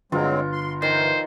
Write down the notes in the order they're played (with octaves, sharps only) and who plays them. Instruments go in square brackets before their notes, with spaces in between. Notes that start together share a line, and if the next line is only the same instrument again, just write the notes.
[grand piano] G1 [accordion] F#3 G#3 C4 [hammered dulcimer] F4
[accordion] C6
[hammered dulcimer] D#3 [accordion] E3 [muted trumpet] C5